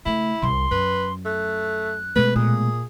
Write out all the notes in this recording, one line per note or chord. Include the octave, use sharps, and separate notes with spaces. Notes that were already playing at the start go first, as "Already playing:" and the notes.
C#3 A3 E4
C2 C3 C6
F#2 B4
A3 F#6
B2 G#3 A3 B4
A#2 G#4